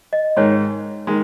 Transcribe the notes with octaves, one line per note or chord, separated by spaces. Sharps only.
D#5
G#2 D#3 G#3 C#5
D#3 G#3